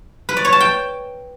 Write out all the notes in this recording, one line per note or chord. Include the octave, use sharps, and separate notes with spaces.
B4
D5
C#5
A5
G5